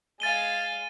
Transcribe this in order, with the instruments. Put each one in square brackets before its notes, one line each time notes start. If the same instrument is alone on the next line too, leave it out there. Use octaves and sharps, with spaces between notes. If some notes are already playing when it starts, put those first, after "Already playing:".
[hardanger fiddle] G#3 F5 [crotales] A6 D#7 G7